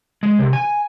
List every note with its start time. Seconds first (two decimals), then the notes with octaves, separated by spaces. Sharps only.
0.23 G#3
0.39 C3
0.53 G#5